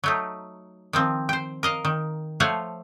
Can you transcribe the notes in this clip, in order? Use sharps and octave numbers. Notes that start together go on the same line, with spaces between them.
F#3 A3 D#4
D#3 F3 C4
C5 G5
A#4 D#5 F5
D#3
F3 A3 C5 C#5 F5 F#5